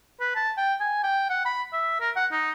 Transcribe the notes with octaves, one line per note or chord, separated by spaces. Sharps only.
B4
A5
G5
G#5
G5
F#5
B5
E5
A#4
F#5
D#4